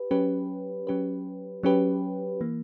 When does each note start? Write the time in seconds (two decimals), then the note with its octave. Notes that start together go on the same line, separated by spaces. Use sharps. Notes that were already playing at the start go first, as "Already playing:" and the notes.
Already playing: G4 B4
0.11 F#3 C#4 G4 B4
0.87 F#3 C#4 G4 B4
1.63 F#3 C#4 G4 B4
2.41 E3 A#3